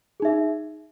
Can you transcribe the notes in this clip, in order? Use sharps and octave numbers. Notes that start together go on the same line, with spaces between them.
D#4 G#4 E5